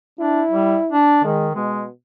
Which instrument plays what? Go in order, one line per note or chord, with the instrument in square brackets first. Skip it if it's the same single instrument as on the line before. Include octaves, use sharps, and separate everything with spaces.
[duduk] D4 [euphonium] E4
[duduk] G3
D4
[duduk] D#3 [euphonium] G#3
[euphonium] B2 [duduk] G#3